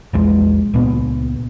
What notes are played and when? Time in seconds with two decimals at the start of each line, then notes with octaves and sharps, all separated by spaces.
0.13 A#1 E2 G#3
0.74 C#2 A#2 B3